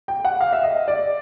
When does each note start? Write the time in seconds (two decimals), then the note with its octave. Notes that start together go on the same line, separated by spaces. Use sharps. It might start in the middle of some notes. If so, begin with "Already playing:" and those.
0.08 G5
0.25 F#5
0.41 F5
0.53 E5
0.63 D#5
0.88 D5